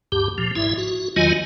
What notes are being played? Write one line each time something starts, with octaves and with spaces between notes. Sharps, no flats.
D2 G2 G4
A#2 F3
G1 G#2 E4 E5
F#4
E2 D#3 F#3 F4 D#5 G#5